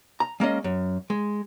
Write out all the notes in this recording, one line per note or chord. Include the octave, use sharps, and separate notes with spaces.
A#5
G#3 A#3 C#4 D#5
F#2
G#3